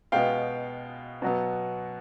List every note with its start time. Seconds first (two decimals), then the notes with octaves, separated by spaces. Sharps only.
0.12 B2 G#3 B3 F5 G5
1.22 B2 F#3 B3